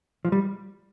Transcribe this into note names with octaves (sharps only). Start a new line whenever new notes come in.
F3
G3